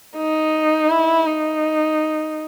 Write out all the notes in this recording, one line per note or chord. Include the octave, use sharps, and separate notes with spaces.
D#4
E4
D#4